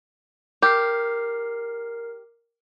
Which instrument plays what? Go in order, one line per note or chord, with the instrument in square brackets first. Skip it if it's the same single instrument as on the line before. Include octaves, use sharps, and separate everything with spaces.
[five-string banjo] G4 [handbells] A#4 F6 C7